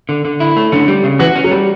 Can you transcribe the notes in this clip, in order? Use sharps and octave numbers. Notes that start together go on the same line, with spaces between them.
D3
D3
E4
A3
D3 C#4
G3
C#3
E3 F#4
C#4
F#3
G3